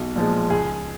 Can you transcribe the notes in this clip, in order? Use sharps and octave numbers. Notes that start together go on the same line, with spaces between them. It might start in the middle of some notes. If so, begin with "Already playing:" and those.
Already playing: B1
A#2 F3 G#3
C#2 G#4